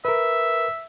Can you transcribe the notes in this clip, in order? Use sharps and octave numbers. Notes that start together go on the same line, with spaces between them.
A#4 B4 E5